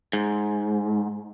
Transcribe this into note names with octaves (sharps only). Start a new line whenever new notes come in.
G#2